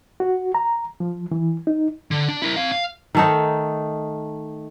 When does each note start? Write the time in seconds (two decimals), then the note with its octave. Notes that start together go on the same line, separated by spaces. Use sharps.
0.20 F#4
0.55 A#5
1.00 F3
1.32 E3
1.67 D#4
2.11 D3
2.28 D4
2.42 E4 A#4
2.56 C4 F5
2.72 F5
3.15 D#3 A3 D#4